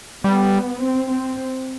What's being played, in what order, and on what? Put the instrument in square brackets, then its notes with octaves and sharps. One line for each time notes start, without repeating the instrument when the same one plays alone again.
[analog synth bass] G3 [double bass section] B3
[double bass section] C4
C4